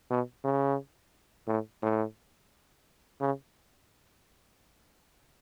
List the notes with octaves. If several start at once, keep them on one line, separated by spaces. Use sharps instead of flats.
B2
C#3
A2
A2
C#3